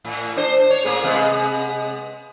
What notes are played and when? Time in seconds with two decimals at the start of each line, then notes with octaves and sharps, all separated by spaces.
0.05 A2
0.36 D4 C5
0.70 C#5
0.84 A2 A#3 G#4
1.04 C3 G#3 B3